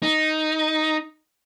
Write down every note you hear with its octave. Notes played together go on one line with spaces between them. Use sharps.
D#4